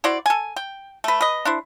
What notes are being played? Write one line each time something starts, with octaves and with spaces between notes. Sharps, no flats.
E4 F#4 C5 D5
A4 G#5
G5
A3 B4
B4 D#5
D4 E4 C5